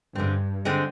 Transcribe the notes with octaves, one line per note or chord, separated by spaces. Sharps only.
G2 D3 G#3 C4
D3 G#3 C4